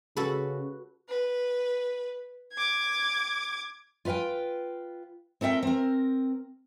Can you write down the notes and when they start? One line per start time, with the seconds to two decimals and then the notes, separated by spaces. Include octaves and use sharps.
0.17 C#3 F#4 A4 B4
1.09 B4
2.53 D6 G#6
4.05 F4 B4 E5 F5 G5
5.41 C4 A4 A#4 E5 G5
5.63 C4 A#4